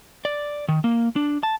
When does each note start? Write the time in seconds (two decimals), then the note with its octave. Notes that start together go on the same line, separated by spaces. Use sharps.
0.25 D5
0.68 D#3
0.84 A#3
1.16 D4
1.43 A5